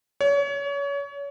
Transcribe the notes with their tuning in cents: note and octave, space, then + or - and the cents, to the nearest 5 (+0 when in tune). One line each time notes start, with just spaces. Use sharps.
C#5 +30